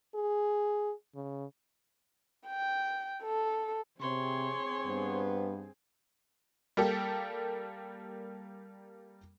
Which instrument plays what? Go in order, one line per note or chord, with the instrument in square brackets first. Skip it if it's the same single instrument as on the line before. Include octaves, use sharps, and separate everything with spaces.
[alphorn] G#4
C#3
[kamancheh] G5
A4
[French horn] C3 [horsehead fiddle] C4 G#4 [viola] C#5 C6
[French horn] G2 [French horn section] B3 C5
[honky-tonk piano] G3 A#3 G4 A4